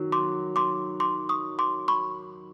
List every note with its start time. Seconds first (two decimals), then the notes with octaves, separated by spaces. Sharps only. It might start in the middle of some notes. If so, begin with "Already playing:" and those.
Already playing: D#3 F#3
0.12 C6 D6
0.56 C6 D6
1.00 C6 D6
1.29 C#6 D#6
1.59 C6 D6
1.88 B5 C#6